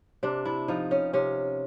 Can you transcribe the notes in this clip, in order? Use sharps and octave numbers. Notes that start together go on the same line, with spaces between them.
C3 D4
E4
F3 D#4
C#4
C3 C#4